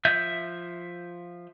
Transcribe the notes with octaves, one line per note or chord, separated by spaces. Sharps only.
F3 E5 G6